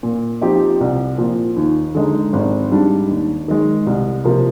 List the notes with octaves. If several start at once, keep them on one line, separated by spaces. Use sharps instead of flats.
A#2
F3 C4 D#4 G4
C2
A#2 F3
D#2
D3 G#3 D#4
G#1
G#2 G3 D4
D#2
D#3 G#3
C2
C3 F3 A#3